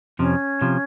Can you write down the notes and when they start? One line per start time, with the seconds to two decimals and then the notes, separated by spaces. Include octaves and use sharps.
0.19 F2 C3 F3 C#4
0.62 C3 F3